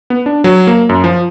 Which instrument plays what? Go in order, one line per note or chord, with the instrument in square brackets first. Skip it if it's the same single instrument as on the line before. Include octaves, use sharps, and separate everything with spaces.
[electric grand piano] B3
D4
F#3
A#3
F#2
F3